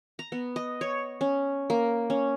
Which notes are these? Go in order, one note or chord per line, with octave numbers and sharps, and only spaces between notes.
A#5
B3
D#5
C#5
C#4
A#3
C#4